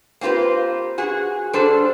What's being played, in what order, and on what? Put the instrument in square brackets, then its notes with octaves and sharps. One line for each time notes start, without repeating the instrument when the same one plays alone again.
[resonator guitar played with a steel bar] A#3 C4 F4 G4 B4
F#4 G#4
G3 D4 A4 C5